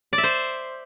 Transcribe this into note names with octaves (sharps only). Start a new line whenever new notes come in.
D5
E5
C5